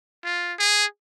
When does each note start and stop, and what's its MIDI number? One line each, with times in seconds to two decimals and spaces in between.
0.24 0.53 65
0.59 0.85 68